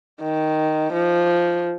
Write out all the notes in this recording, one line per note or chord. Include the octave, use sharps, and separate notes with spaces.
D#3
F3